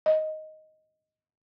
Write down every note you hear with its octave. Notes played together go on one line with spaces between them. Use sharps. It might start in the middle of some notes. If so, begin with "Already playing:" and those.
D#5